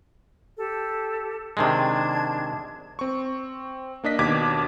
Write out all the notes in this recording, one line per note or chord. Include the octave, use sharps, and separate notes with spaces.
G4 A4
C3 D#3 G#3 D4 A5 G#6
C4 C#6
A#3 D4 D#5 B6
D#2 B2 D4 D6 G#6